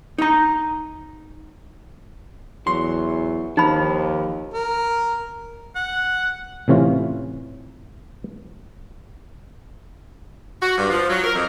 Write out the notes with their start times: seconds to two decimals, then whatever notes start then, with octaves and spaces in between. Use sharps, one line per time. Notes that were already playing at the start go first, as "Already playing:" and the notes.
0.18 D#4 A#5
2.67 E2 F#3 C6
3.57 D#2 F3 D#4 B5
4.54 A#4
5.75 F#5
6.68 A2 C3 E3 C#4 F4
10.62 F#4
10.77 G2
10.90 F3
11.10 F#3
11.24 A#4
11.35 F2